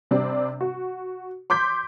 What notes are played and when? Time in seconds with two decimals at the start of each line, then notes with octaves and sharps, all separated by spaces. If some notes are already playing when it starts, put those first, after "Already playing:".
0.11 C3 G3 C4 D4
0.61 F#4
1.50 C6 D6 G6 B6